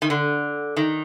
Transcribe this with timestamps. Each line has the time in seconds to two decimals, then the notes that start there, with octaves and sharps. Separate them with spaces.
0.02 D#3
0.10 D3
0.76 D#3